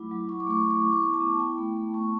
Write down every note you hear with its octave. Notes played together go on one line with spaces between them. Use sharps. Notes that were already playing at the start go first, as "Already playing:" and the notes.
Already playing: F#3 A3 E4 B5 D6
F#3
E4 C#6
D6
A3 C#6
A3 D6
C#6
E4 D6
C#6
B3 D6
A5 C#6
B3
E4 G5 B5
A3
A3
B3 A5 C#6